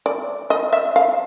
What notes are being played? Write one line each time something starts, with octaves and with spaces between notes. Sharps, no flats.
D5
D#5
E5
F5